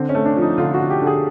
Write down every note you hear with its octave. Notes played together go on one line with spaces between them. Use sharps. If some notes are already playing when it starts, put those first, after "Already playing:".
Already playing: D3 C4
C#4
A3
D4
F3
D#4
D3 F4
F#4
D3
G4
D3
G#4